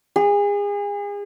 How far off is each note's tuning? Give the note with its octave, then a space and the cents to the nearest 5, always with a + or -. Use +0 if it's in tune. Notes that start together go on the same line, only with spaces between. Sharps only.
G#4 -35